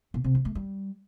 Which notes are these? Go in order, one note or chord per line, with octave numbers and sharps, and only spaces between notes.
B2
C3
F3
A3
G3